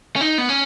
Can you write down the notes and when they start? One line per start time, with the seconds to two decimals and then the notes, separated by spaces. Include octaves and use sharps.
0.16 C#4
0.21 D#4
0.38 B3
0.49 C#4